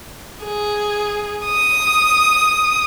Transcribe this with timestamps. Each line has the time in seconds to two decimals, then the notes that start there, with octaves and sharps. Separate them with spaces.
0.43 G#4
1.46 D#6